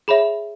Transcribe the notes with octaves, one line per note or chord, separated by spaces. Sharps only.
G#4 C#5 E5 B5